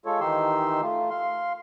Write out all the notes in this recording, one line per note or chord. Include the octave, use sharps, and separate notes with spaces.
G#3 F4 A4 C#5
D#3 E3 D#4 G4 C6 E6
A3 F4
F5 C6